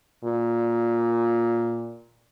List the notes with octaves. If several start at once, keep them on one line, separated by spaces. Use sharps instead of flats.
A#2